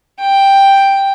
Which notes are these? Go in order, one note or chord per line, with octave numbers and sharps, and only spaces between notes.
G5